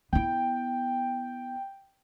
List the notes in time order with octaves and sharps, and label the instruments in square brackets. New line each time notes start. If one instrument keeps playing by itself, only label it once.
[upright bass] B3 E4 [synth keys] G5